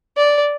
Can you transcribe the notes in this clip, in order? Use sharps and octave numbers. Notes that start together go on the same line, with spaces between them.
D5